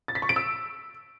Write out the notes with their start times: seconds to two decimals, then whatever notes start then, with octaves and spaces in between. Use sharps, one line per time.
0.08 A6
0.15 B6
0.22 C#6
0.29 D7
0.36 E6